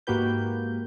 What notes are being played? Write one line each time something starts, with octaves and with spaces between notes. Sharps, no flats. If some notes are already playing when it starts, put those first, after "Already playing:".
G#2 A#3 F#4 G4 B4 G6